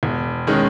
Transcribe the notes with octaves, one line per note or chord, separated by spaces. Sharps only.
E1
D#3 G#3 C#4